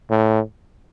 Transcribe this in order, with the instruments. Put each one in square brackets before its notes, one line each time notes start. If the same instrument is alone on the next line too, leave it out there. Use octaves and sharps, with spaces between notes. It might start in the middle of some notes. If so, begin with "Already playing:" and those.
[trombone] A2